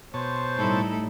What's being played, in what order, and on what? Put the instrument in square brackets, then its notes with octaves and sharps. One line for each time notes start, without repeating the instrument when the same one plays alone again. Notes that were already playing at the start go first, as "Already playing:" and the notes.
[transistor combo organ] B2 C#5 A5 [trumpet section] C5
[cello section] A2 G3 [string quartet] D#4 E4 A4